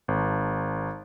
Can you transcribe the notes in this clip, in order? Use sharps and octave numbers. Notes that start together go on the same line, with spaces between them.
G#1